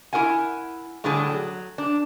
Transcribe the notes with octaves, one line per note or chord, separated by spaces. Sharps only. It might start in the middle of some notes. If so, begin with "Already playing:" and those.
E4 G4 A#4 F#5 G#5
A2 D3 G3 D4 G#4 A5
F#3
D4